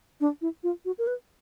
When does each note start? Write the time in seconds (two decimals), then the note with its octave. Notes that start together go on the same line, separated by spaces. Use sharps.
0.20 D4
0.41 E4
0.63 F4
0.85 F#4
0.98 A#4
1.07 B4